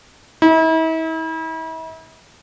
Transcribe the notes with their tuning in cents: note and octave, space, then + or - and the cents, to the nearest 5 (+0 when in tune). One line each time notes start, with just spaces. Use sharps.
E4 -40